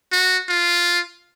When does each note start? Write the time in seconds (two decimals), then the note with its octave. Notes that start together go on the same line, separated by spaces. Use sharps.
0.12 F#4
0.49 F4